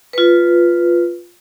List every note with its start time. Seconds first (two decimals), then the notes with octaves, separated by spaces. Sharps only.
0.13 F4 B4